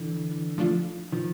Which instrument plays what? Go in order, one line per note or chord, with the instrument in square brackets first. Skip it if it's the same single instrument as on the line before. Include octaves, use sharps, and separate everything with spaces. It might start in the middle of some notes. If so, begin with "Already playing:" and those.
Already playing: [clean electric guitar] D3 E3
[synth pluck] F3 A3 D4 F4
[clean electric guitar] D#3 F3